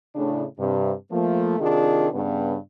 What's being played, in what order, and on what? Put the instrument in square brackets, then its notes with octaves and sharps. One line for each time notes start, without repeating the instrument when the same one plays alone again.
[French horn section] A2 C#3 D4
G2 C3
F3 A3 A#3
C3 D#3 D4 D#4 F4 G#4
G2 C#3 B3